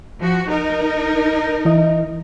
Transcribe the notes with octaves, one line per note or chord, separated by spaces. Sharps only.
F3 F#4
D#4 A#4
E3 E4 D#5